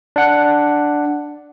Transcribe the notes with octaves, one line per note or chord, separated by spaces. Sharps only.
D4 F#5